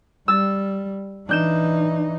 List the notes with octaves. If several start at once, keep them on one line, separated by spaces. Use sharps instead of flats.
G3 E6 A6
E3 D4 D#4 G6 E7